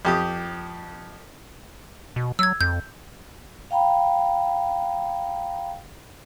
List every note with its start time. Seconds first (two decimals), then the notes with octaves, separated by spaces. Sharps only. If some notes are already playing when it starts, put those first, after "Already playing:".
0.05 F2 G4 D#6
2.16 B2
2.39 F#3 E6 G#6
2.61 F2 G6
3.71 F5 G5 A#5 B5